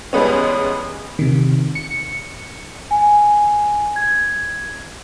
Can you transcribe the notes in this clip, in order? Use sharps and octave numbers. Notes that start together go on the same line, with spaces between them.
E2 G3 G#3 B3 C#4
C3 D#3
C#7
G#5
G#6